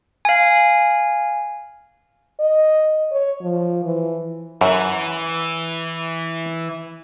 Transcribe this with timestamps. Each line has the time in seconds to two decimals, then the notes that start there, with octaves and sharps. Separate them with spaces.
0.25 F5 G#5
2.39 D#5
3.12 C#5
3.41 F3
3.84 E3
4.61 F#2 E3